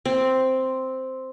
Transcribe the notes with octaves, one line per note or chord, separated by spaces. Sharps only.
C4